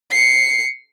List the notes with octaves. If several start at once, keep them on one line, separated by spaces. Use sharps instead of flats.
C7 C#7